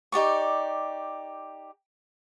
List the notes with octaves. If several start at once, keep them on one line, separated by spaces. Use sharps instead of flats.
D#4 G4 D5 C#6